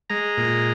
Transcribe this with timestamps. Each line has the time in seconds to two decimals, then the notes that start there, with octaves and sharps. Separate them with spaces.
0.10 G#3 A#5
0.38 A#2